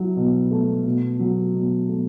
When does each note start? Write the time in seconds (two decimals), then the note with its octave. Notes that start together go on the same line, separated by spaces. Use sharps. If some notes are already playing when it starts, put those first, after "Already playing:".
Already playing: F#3 E4
0.16 B2
0.51 A3
0.86 B2
1.19 F#3
1.54 B2
1.89 A3